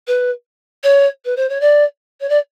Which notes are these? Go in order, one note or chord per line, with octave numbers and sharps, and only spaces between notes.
B4
C#5
B4
C5
C#5
D5
C#5
D5